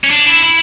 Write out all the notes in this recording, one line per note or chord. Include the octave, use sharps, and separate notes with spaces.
C#4
D4
E4
E4